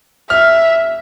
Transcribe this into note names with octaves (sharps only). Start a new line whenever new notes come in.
E5 F6